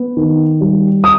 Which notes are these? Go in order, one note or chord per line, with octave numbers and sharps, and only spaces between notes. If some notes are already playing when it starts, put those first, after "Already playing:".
Already playing: B3
D#3
G3
D#6